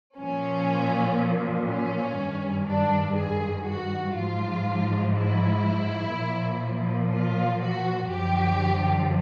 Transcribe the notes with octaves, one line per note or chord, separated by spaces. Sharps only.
A#2 F3 C#4
C#4
G2 D#3
D4
G#4
F#4
G#2 F3 F4
E4
A#2 F3
F4
F#4
F#2 D3 F3 G4